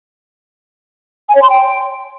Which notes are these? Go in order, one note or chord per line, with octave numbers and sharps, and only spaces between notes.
G#5
C#5
C6
G5